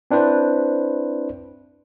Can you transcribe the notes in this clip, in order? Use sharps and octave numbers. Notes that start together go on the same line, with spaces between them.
C4 D4 E4 B4 C5